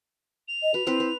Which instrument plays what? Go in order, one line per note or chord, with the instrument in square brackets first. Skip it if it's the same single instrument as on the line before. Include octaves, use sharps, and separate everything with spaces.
[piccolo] F7
[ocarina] D#5
[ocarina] F#4 [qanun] B4
[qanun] C4 B4 C5 [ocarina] E4
[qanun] B4